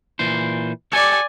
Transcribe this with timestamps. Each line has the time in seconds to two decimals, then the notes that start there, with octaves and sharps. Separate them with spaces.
0.19 A#2 E3 C5
0.92 G4 A4 C#5 D5 G#5